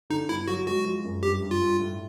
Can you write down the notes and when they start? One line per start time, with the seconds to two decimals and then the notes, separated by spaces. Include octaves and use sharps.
0.10 D3 D#4
0.29 G1 E4
0.48 F#3 F#4
0.67 G#3 F#4
0.85 F3
1.04 F#2
1.23 G2 G4
1.42 G2
1.51 F4
1.61 G2
1.80 A2